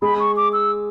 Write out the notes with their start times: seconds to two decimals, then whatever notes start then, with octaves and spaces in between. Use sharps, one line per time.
0.02 G#3 G#4 B5
0.20 C#6
0.37 D6
0.53 E6